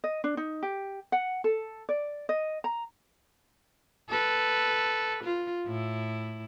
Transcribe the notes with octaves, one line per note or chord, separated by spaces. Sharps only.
D#5
D4
D#4
G4
F#5
A4
D5
D#5
A#5
A4 B4
F4
A2 E4